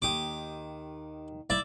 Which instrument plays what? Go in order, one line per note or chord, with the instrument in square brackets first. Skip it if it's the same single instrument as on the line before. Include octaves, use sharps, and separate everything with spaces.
[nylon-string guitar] D#2 D#3 G4 [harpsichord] D6 D#6
[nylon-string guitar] E4 [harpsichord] D5 E5